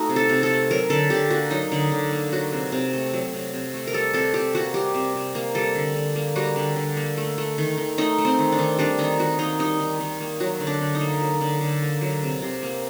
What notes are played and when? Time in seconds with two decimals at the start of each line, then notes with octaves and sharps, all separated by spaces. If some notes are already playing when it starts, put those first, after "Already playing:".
Already playing: A3 D#4 F#4
0.09 C3
0.16 A4
0.29 C3
0.43 A4
0.50 A3
0.71 F#3 A#4
0.90 D3 A4
1.10 D3 G4
1.30 A#3 F#4
1.51 F#3 D#4
1.72 D3
1.92 D3
2.12 A#3
2.32 F#3 F#4
2.52 C3
2.72 C3
2.93 A3
3.13 F#3
3.33 C3
3.53 C3
3.74 A3
3.87 A#4
3.93 G3 A4
4.13 C3 A4
4.34 C3 G4
4.55 A#3 F#4
4.74 G3 G4
4.94 C3
5.16 C3
5.35 A#3
5.55 G3 A4
5.75 D3
5.96 D3
6.16 A#3
6.36 G3 F#4
6.56 D3
6.76 D3
6.97 A#3
7.18 A3
7.38 A3
7.58 D#3
7.78 D#3
7.98 A3 D#4
8.18 A3
8.25 C4
8.39 D#3
8.52 D4
8.59 D#3
8.78 G3 D4
8.99 D#3 D#4
9.19 D#3 F#4
9.39 A#3 D#4
9.59 G3 D#4
9.80 D#3
10.00 D#3
10.20 A#3
10.40 F#3 F#4
10.60 D3
10.67 D4
10.81 D3
10.95 D#4
11.01 A#3
11.21 F#3
11.41 D3
11.61 D3
11.82 A#3
12.01 F#3
12.23 C3
12.42 C3
12.63 A#3